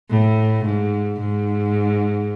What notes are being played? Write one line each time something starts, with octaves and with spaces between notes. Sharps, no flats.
A2
G#2
G#2